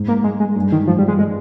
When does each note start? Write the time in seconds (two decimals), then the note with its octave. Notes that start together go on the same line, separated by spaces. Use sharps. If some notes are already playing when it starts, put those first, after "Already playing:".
Already playing: G#2
0.08 A#3
0.24 G#3
0.40 G#3
0.56 G2
0.72 D#3
0.87 G#2 F3
0.99 G3
1.08 G#3
1.19 G#3